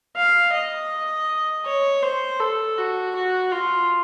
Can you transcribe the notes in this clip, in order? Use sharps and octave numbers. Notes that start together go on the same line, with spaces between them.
F5
D#5
C#5
C5
A4
F#4
F#4
F4